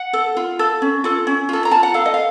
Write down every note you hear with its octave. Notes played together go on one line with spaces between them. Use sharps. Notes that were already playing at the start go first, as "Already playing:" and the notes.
Already playing: F#5
A4
F4
A4
C#4
F4 A4
C#4
F4 A4
A#5
F4 A5
F#5
A4 F5
D#5
F5